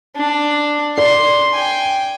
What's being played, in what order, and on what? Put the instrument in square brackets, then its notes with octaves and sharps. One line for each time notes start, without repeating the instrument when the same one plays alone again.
[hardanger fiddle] D4
[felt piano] D5 [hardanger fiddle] C6
[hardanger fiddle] G5 G#5